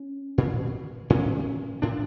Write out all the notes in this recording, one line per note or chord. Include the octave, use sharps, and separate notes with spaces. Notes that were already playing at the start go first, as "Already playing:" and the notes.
Already playing: C#4
A#2
A2 C#4
A2 D4